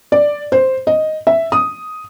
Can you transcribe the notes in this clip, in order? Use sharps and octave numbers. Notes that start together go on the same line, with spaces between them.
D5
C5
D#5
E5
D#6